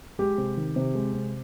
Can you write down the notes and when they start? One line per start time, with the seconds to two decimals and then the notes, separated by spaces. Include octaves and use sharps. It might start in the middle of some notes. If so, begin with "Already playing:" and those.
0.19 G#3 G4
0.38 C3
0.57 D#3
0.76 C3
0.95 G#3
1.14 C3